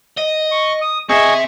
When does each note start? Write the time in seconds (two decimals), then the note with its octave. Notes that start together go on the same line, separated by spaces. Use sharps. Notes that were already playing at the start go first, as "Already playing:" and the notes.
0.18 D#5
0.52 C#6
0.81 D#6
1.09 C4 G#4 D#5 E5 C#6